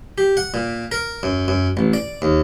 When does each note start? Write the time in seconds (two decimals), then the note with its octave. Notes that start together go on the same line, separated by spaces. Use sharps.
0.18 G4
0.37 F#5
0.54 A#2
0.92 A#4
1.23 F#2
1.48 F#2
1.77 A1
1.94 D5
2.22 D#2